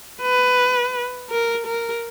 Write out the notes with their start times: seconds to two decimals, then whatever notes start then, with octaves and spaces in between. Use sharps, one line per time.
0.22 B4
1.31 A#4
1.67 A#4